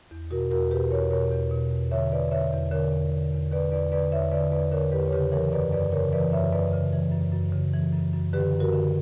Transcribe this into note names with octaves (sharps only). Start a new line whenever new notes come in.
E2
B2 F#4 A#4
E2 F#4 A#4
B2 G4 B4
E2 A#4 C#5
B2 A#4 C#5
E2
B2
E2
D3 C#5 E5
E2 B4 D5
D3 C#5 E5
E2
D3 A#4 C#5
E2
D3
E2
D3 B4 D5
E2 B4 D5
D3 B4 D5
E2 C#5 E5
D3 B4 D5
E2 B4 D5
D3 A#4 C#5
E2 G4 B4
C#5
C#3 G4 B4
E3 A#4 C#5
F#2 B4 D5
F#2 B4 D5
C#3 A#4 C#5
E3 B4 D5
F#2 C#5 E5
F#2 B4 D5
C#3
E3
F#2
F#2
C#3
E3
F#2
F#2
D3 G4 B4
F#2
F#4 A#4
D3